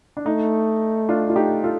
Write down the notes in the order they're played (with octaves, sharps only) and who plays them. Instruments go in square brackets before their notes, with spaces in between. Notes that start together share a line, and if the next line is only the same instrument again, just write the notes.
[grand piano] D4
[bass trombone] A3 [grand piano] D#4
[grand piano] D4 F4
F4
D#4 G4
F4 A4